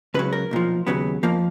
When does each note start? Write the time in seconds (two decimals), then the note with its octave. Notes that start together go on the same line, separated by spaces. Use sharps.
0.14 C#2 C#3 F#3 B4
0.33 A#4
0.51 B1 A#2 F3
0.87 D#2 C#3 F#3 B3
1.23 F2 F3 A#3